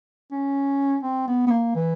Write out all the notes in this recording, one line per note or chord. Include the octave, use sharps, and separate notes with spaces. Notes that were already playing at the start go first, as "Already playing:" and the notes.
C#4
C4
B3
B3
A#3
E3